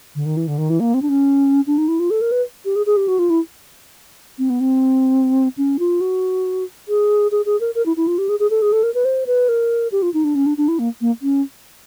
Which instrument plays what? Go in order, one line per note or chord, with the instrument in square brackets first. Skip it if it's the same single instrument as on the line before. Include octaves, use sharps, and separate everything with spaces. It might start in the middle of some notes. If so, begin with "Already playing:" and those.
[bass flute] D3
D#3
E3
D3
D#3
E3
A#3
C4
D4
C#4
D4
D#4
E4
F4
A4
A#4
B4
G4
G#4
G#4
G4
F#4
F4
E4
C4
B3
C4
C#4
F4
F#4
G#4
G#4
G#4
A#4
A#4
E4
E4
F4
G4
G#4
G#4
A4
G#4
A4
A#4
B4
C5
B4
A#4
G4
F4
D#4
D4
C#4
D4
D4
E4
A#3
A#3
C#4